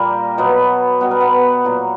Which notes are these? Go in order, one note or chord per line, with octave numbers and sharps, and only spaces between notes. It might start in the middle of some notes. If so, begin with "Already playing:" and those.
Already playing: A#2 G3 A#3 G4 A#4
B2 F#3 B3
B2 G3 B3 B4
A#4
B3 B4
A#2 F#3 A#3